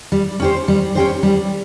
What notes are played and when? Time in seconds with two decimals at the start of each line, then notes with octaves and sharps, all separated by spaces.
0.12 G3
0.40 C#4 G4 C5
0.68 G3
0.95 C#4 G4 C5
1.23 G3